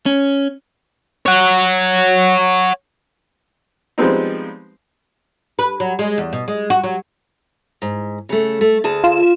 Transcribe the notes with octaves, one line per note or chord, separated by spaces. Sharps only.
C#4
C#5 F#5
F3 G3 G#3 B3 C4 D#4
B4
F#3
G#3
E2
B2
G#3
F#4
F#3
G#2
C#3 A3
A3
D2 G#4 A5
F4 E7